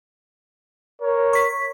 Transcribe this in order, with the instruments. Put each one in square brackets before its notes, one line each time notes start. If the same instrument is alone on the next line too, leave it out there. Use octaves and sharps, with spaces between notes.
[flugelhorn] A#4 [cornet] C#5
[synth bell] C#6 B6